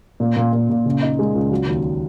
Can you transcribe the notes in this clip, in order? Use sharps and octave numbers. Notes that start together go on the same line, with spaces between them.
A#2
A#2
A#2
A#2
C#3
D#4
G#3
C#2
F#3
D#2